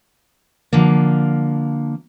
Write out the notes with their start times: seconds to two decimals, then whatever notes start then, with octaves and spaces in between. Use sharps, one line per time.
0.73 D3 F3 A#3